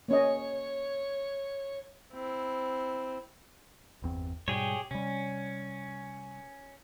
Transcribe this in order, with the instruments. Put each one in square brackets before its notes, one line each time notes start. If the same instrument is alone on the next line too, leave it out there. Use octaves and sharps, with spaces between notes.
[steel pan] A#3 C#4 D#5 [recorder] C#5
[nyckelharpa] C4 E4
[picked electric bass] G1 E2 C4
[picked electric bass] G#2 B2 G3 [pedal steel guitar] G4 G#4 C#5
[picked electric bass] C3 G3 [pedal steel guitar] C#4